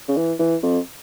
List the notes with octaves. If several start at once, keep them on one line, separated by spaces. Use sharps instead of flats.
C#3
E3
E3
F2